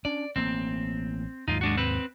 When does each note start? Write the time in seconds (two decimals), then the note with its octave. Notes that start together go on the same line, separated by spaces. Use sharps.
0.05 C#4 D4 D5
0.36 A1 A#3 C4
1.48 D#2 G#2 D#4 F4
1.61 G#3 D4 F#4
1.77 C4 B4